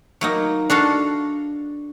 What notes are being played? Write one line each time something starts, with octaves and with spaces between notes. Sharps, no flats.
F#3 A#3 D#4
D4 F#4 A4 F5